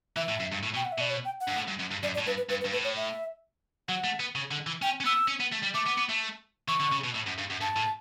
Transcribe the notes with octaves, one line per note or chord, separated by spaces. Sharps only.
E3 E5
A2
F#2
G2
A2
B2 G5
F#5
E5
B2 D5
C#5
G5
F#5
G2
A2
G2
F#2
G2
F#2 D5
D5
A2
G2 B4
B4
G2 B4
B4
G2
A2 B4
C#5
E5
F#3 F#5
A3
B3
C#3
D3
E3
C#4 G5
C#4
B3 E6
C#4
B3
A3
G3
A3 D6
B3
B3
A3
E3 C#6
D3
C#3
B2
A2
F#2
G2
F#2
G2 A5
A2